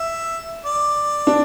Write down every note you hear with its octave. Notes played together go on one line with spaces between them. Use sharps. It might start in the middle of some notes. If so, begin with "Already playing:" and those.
Already playing: E5
D5
D4